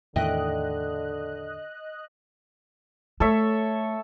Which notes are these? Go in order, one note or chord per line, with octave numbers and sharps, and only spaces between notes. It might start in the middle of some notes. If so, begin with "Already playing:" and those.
E2 A2 D3 D#3 D#5 E5 G5 F#6
A3 A4 C#5 E5